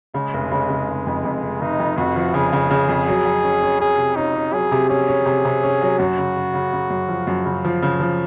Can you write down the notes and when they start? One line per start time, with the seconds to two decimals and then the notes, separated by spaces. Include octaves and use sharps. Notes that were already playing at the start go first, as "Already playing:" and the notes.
0.14 C#3 G#3
0.34 F1
0.52 C#3
0.70 C#3
0.88 F1
1.07 F2
1.25 F2
1.43 F1
1.61 F1 D#4
1.80 F2
1.97 F2 F#4
2.16 F3
2.34 C#3 G#4
2.53 C#3
2.71 C#3
2.89 F2
3.07 F#3
3.25 F#3
3.44 C#4
3.63 C#4
3.80 C#4 G#4
3.98 C3
4.16 C#4 D#4
4.35 C#4
4.53 F#3 G#4
4.72 C3
4.90 C#4 G#4
5.08 C#4
5.26 C3
5.45 C3
5.63 C#4
5.81 F#3
5.99 F#2 F#4
6.18 C#3
6.36 C#3
6.54 C#3
6.73 C#3
6.90 F#2
7.09 F3
7.27 F#2
7.45 C#3
7.64 F3
7.82 C#3
8.00 F3